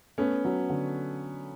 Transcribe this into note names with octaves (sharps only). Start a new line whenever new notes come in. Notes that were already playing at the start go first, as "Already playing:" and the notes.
A3 B3 C#4
F#3
D3